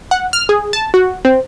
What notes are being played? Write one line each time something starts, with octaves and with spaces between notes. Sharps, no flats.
F#5
F6
G#4
A5
F#4
C4